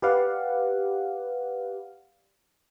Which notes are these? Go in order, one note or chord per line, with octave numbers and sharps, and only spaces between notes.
G4 B4 D5 F5 F#5